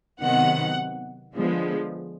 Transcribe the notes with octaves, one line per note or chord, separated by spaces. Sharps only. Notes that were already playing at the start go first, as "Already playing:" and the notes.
C3 D#3 F#3 B3 F#5
D3 F3 G#3 B3